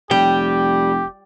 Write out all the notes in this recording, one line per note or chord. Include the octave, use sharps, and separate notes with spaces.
F1 G3 G4 G5